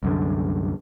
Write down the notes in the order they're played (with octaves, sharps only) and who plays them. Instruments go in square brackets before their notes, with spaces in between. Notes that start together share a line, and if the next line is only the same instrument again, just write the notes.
[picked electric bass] C2 F#2 D3